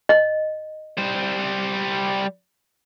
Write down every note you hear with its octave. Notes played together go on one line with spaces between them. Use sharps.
D#5
G3 C5